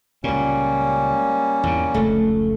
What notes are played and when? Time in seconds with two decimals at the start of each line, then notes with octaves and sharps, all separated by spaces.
0.24 C#2 A#2 G3 A#3 C#4
1.63 E2 G#2 C3
1.94 F1 C#2 A3